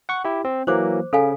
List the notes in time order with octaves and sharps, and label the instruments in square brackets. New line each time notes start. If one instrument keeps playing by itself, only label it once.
[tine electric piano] F#5 C#6
E4 G4
C4
[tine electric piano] E3 F#3 A#3 [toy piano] C5 D6
[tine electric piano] C#3 [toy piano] A4 F5 G#5